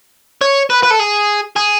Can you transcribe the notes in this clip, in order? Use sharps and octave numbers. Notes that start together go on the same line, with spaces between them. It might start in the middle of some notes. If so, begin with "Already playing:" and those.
C#5
B4
B4
A4
G#4
G#4